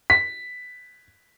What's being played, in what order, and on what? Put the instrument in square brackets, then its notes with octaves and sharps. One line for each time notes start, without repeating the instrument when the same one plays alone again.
[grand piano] B6